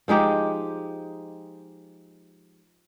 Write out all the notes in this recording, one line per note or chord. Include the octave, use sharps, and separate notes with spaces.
F3 G#3 D#4 G4